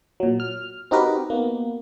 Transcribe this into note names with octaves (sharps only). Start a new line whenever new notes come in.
A#2 F#3
F6
C4 D#4 F#4 G4 A#4 B4
A#3 B3